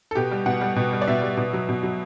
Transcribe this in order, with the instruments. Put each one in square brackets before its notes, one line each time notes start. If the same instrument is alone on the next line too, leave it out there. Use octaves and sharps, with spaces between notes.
[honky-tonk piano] A4
B2 G4
G3
B2 F#5
G3
B2
G3
D5
B2 E5
G3
B2
F#3
B2
F#3